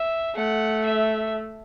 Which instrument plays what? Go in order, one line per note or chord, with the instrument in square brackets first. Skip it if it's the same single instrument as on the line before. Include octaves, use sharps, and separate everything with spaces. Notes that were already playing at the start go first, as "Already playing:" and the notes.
Already playing: [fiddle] E5
[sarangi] A3 [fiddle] F#5
[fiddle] E5